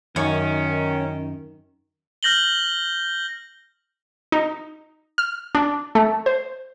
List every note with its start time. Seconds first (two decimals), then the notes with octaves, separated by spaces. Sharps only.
0.16 F#2 D#3 C#4 C#5
2.23 F6 G6 A#6 F#7 G7
4.32 D#4
5.18 F6
5.55 D4
5.95 A3
6.26 C5